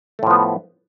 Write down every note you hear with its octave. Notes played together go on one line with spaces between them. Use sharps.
A2 F3 A3 B3